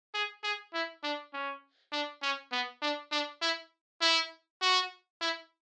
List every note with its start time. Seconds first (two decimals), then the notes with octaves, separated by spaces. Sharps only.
0.14 G#4
0.44 G#4
0.74 E4
1.03 D4
1.33 C#4
1.92 D4
2.22 C#4
2.52 B3
2.82 D4
3.12 D4
3.42 E4
4.01 E4
4.62 F#4
5.21 E4